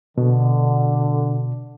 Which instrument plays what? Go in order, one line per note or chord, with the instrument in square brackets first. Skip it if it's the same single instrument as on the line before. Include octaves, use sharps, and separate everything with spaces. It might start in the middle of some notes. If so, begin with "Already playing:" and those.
[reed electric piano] B2 [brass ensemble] D3